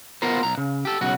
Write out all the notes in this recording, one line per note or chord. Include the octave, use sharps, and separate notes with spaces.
B3 F4 A#4 C5
B1 A#5
C#3
G4 A4
B1 C#3 F#4